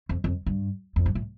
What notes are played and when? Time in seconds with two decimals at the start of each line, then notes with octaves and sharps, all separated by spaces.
0.09 F2
0.24 F2
0.46 G2
0.96 F2
1.06 G2
1.15 A2